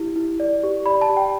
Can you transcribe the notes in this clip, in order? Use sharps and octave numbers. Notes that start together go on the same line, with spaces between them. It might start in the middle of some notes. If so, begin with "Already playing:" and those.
Already playing: E4 G4
E4
D5
G4
D5 B5
A5
G4
G5